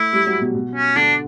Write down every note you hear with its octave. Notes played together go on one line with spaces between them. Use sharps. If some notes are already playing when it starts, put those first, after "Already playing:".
Already playing: A3 E4
G3
F#3
B2
B2
C#4
D3 D4